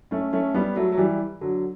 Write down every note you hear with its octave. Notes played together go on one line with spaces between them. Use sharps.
A3 C#4
A3 C#4
G3 B3
F#3 A3
F#3
E3 G3
D3 F#3